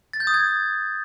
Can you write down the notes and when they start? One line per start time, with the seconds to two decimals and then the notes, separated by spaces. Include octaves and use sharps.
0.13 A6
0.20 G6
0.27 D#6
0.34 G#6